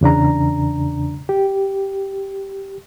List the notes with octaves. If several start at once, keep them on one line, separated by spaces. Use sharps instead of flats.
E2 C#3 D4 A#5
G4